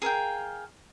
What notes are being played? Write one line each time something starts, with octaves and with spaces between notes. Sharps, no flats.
G#4 A#4 F5 G5